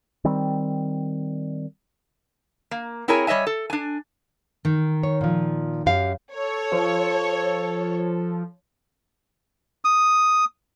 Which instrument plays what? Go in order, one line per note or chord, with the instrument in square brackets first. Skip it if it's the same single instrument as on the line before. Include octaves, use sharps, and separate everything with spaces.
[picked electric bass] D#3 G3 C4
[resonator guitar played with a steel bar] A#3
C4 E4 G#4 A#4 C#5 G#5
G3 C#5 D#5 E5 G#5
A4
D4 G#5
[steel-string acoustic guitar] D#3
[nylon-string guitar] C#5
A#2 F3
F#2 G4 F5
[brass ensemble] A4 [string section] C#5
[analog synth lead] F3
[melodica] D#6